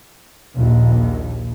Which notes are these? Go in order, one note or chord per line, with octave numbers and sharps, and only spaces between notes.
A#1 D#2